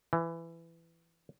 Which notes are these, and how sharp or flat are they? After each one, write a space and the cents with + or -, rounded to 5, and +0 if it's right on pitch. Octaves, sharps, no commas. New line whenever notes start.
E3 +15